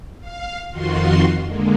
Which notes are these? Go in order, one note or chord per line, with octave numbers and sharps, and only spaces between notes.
F5
F2 D#3 F4 F#4 C6
D3 G#3 A#3